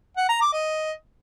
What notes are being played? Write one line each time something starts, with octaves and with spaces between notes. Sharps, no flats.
F#5
A#5
D6
D#5